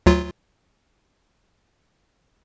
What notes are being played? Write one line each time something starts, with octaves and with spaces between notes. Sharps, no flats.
D2 F#3 F4